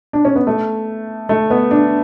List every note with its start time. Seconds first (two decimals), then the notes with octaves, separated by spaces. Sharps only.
0.13 D4
0.25 C#4
0.36 B3
0.47 A3
1.29 A3
1.51 B3
1.71 D4